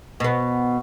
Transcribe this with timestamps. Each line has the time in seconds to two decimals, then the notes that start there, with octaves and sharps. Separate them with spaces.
0.20 B2 B3